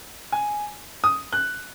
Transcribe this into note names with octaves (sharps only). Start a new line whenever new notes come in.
G#5
D#6
F#6